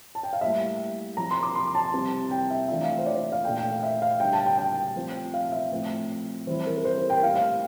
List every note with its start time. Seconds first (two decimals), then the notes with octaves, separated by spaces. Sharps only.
0.15 A5
0.23 G5
0.33 F5
0.41 A2 G3 A#3 E4 E5
1.17 F3 C4 F4 A#5
1.31 C6
1.43 D6
1.55 C6
1.75 A5
1.93 C3 G3 C4 E4 G4
2.31 G5
2.51 E5
2.68 E3 A3 D4 F4 E5
2.84 F5
2.87 E5
2.98 C5
3.06 D5
3.19 E5
3.32 F5
3.44 A#2 A3 D4 A4 G5
3.57 G5
3.70 F5
3.83 E5
4.02 F5
4.20 D3 G3 D4 G4 G5
4.33 A5
4.46 G5
4.58 G5
4.96 F3 A3 C4 F4 C5
5.34 F5
5.52 E5
5.71 A2 F3 C4
6.47 E3 G3 C4 E4 G4 C5
6.67 A#4
6.78 A#4
6.85 C5
6.98 A#4
7.10 G5
7.23 A2 G3 A#3 E4 G4 F5
7.36 F5